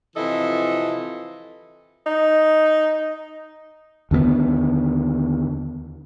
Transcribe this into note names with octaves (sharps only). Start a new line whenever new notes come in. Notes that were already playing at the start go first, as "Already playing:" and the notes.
C3 E3 F3 A4 D#5 E5
D#4
D#2 D3 A3 B3